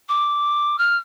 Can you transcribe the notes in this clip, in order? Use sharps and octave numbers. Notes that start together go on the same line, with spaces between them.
D6
F6